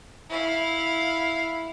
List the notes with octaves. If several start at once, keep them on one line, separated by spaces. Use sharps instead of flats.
E4 F5